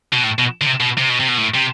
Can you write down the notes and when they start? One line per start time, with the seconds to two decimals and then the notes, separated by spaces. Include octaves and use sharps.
0.13 B2
0.24 A2
0.39 B2
0.61 D3
0.66 C3
0.80 B2
0.98 C3
1.10 B2
1.20 C3
1.29 B2
1.38 A2
1.55 C3